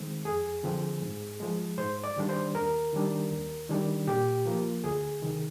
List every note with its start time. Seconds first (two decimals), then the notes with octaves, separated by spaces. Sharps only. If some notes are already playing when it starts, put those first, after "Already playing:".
Already playing: D#3 G#3 C4
0.25 F2 G#4
0.63 D3 F3 C4
1.02 G#2
1.40 F3 G#3
1.78 G#2 C5
2.04 D5
2.16 D#3 G3 D4
2.29 C5
2.55 D#2 A#4
2.93 D#3 G3 D4
3.31 D#2
3.69 D#3 G3 D4
4.07 A#2 G4
4.46 F3 A#3 F4
4.84 D2 G#4
5.22 C3 D#3